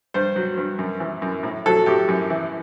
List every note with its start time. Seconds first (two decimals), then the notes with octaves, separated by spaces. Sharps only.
0.14 G2 C5
0.36 F#3
0.57 G2
0.79 F#2
1.00 E3
1.22 F#2
1.43 A2
1.66 F#3 A4
1.86 A2 G4
2.08 F#2
2.30 E3